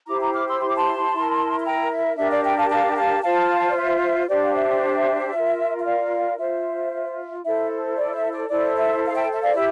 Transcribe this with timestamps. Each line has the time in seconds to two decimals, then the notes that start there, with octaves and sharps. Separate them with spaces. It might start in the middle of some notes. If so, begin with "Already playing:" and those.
0.07 E4 G4 C5 A#5 D6
0.20 A#5 D6
0.33 D6 F6
0.47 C6 E6
0.60 C6
0.69 D6
0.76 A5 C6
1.13 E4 A#4
1.59 C6
1.65 G5 A#5
1.91 E5
2.17 D4 G4 A#4 E5
2.30 D5 F5
2.44 E5 G5
2.57 F5 A5
2.70 F5 A5
2.91 G5
2.96 F5 A5
3.23 F4 C5 F5 A5
3.70 D5
3.76 E5
4.28 D4 G4 C5 D5
4.43 F5
4.55 E5
5.33 F4 A#4
5.80 E5
5.85 D5 F5
6.38 F4 C5 E5
7.44 E4 A4 C5 E5
7.96 D5
8.14 E5
8.32 D5
8.49 E4 A4 C5 D5
8.76 E5
9.06 F5
9.15 E5 G5
9.32 E5
9.41 D5 F5
9.54 E4 G4 E5